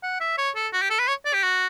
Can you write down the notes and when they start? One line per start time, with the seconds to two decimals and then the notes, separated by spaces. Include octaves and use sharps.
0.03 F#5
0.21 E5
0.38 C#5
0.56 A4
0.73 F#4
0.82 G4
0.90 A4
0.99 B4
1.08 C#5
1.25 D5
1.34 G4
1.43 F#4